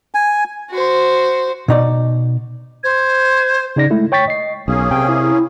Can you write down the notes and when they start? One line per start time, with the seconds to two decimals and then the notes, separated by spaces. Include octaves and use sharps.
0.14 G#5
0.70 F#4 C5
1.68 B2 D#4 D5
2.83 C5 G#6
3.76 C#3 D#4 D5 A#6
3.90 G#3 A3 E4
4.12 C#5 G5 C#6 A6 B6
4.28 D#5 C7
4.68 B1 A#3 C#4 G#4
4.91 C3 G5
5.09 E4